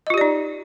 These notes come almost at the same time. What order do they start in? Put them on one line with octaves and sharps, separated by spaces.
D#5 F4 G4 D5 D#4